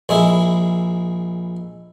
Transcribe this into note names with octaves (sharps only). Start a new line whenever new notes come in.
A#1 G#3 E4